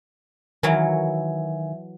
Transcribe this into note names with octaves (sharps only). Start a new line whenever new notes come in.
D#3 E3 F#3 A#4 E5 G#5